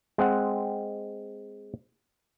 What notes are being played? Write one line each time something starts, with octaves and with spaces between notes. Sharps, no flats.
G#3 C4 F#5